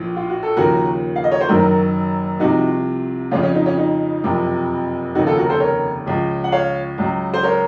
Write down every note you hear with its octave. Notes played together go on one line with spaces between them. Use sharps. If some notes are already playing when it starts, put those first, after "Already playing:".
Already playing: A#1 A2 F3
F4
F#4
A4
D#2 C#3 F3 F#4 A#4
F5
D#5
C#5
C5
F#1 F#2 D#3 F#3 F#4 A#4
C2 C3 F3 D#4 F#4
F2 C#3 F3 C#4 F4
C#4
D#4
C#4
D#4
F#1 F2 C3 F3
F1 D#2 C#3 D#4 F#4
F4 A4
F#4 A#4
A4 C5
A#4 C#5
C#2 C#3 F3
F#5
C#5 F5
C#2 C#3 F#3
C5
A#4 C#5